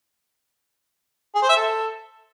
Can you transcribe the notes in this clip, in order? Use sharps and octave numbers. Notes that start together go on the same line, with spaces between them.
G#4
C5
E5
A4